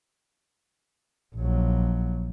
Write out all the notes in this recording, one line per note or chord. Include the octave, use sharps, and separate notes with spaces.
A#1 F#3